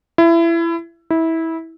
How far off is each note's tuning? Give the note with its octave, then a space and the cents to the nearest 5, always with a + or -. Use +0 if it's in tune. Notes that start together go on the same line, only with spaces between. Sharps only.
E4 +25
E4 -20